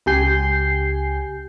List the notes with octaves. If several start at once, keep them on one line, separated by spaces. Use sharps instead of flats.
C#2 C#3 G4 G#5 G6 C7